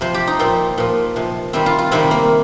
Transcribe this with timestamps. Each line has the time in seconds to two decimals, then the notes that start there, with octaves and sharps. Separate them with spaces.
0.01 C3 F3 C5
0.14 G4
0.27 D#4
0.39 A#2 F3 C4
0.78 A#2 F3
1.16 C3 F3
1.53 C3 D#3 G3 C4
1.66 F4
1.79 F4
1.91 C3 D#3 G3 C4
2.11 A#3